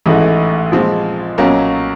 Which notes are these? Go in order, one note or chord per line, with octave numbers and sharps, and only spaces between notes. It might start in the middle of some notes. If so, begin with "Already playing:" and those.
A1 G#2 E3 A3
A#2 F3 G#3 C4
B1 A#2 F#3 A#3 C#4